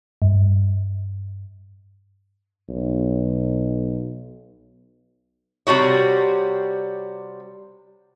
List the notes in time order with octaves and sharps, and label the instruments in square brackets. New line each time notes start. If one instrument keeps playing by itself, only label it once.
[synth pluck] G2
[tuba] B1
[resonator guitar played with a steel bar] C3 G3 F#4 C#5